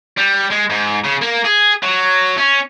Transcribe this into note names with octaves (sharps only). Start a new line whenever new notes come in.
G3
G#3
G#2
C#3
A#3
G#4
F#3
C#4